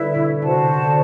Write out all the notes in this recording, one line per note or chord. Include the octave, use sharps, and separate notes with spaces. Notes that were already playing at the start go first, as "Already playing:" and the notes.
Already playing: D3 G3 A3 E4 B4 E5
B2
C3 F#4 C5 F#5 A5
C3
D3